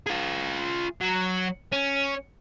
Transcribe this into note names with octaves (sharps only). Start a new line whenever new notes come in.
F4 G#4
F#3
C#4